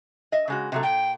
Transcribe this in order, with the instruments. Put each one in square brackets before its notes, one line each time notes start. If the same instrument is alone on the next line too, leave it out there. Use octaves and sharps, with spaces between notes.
[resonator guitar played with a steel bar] D#5 E5
C#3 G#3 F#4
C3 F#3 A3
[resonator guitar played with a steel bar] A#2 [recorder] G5